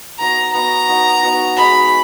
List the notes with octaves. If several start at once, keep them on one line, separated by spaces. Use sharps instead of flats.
B3 D#4 F#4 C#5 A#5
B3 D#4 F#4 C#5 A#5
B3 D#4 F#4 C#5
B3 D#4 F#4 C#5
G#3 D#4 F#4 B5